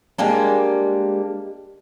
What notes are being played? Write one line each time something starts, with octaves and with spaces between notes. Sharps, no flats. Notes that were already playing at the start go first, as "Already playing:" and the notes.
G3 G#3 A#3 D4